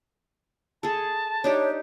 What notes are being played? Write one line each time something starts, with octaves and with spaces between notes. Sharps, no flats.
G#4 A4 A5
D4 D#4 G4 C#5